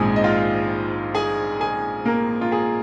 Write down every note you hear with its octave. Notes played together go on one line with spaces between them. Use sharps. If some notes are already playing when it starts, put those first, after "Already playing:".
Already playing: A#1 G#2 D#3 G#3 C4 G#4 G#5
D#5
F4 F5
G#4 G#5
G#4 G#5
A#3 A#4
F4
G#4